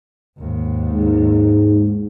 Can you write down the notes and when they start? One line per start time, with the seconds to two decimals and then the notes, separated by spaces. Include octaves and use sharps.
0.38 G#1 D#2
0.91 G#2